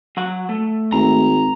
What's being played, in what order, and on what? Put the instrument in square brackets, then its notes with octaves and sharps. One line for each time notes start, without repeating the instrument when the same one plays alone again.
[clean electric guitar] F#3 F#5
A3
[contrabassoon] G#1 [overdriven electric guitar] A#5